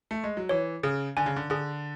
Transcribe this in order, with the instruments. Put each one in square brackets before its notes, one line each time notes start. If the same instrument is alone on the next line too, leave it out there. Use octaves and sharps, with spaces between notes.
[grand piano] A3
G#3
F#3
[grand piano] E3 [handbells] C#5
[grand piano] C#3 [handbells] G#4
[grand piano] D3 [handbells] G#5
[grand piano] C#3
D3
[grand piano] D3 [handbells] G#4